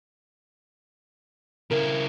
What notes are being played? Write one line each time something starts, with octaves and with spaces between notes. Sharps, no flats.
C#3 E4 A#4